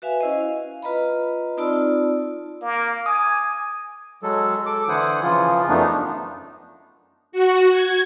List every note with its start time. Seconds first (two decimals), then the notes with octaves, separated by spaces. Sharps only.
0.02 F#4 B4 E5 F5 G#5
0.21 C#4 E4 C5 D#5
0.41 F5
0.83 F4 B4 D#5 A#5 B5
1.57 C4 D#4 F4 D5 A5 E6
2.62 A#3
3.06 G#5 D6 D#6
4.23 F#3 G#3 A4
4.66 A4 D6
4.88 D3 E3 E4 C5 F#5 D#6
5.22 C#3 E3 F3 F4
5.68 F#2 F3 A3 B3 D4 D#4
7.32 F#4
7.71 G#6